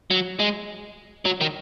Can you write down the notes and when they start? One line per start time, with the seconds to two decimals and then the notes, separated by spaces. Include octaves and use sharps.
0.11 F#3
0.40 G#3
1.26 F#3
1.41 D#3